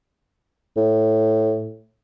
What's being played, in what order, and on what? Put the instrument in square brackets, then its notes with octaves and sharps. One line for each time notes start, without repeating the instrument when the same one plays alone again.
[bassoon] A2